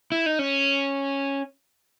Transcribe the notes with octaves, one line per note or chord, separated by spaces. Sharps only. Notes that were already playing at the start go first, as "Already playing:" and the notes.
E4
D#4
C#4